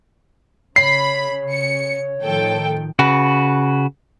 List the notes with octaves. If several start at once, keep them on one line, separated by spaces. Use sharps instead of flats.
C#3 C#5 B5 C7
C#7
A2 D#3 F3 A4 G5
C#3 F#4 B4